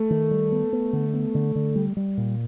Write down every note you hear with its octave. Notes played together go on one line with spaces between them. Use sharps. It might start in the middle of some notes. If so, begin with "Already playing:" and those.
Already playing: A3
D#3
G3
B3
B3
D3
B3
D3
D3
G3
G3
A#2